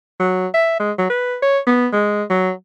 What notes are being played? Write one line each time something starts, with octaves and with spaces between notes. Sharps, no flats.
F#3
E5
G#3
F#3
B4
C#5
B3
G#3
F#3